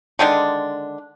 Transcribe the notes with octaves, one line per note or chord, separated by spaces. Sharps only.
D3 D#3 G#3 D4